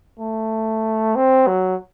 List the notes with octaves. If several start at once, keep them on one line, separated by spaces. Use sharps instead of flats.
A3
C4
F#3